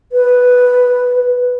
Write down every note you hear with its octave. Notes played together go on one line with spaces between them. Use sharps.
B4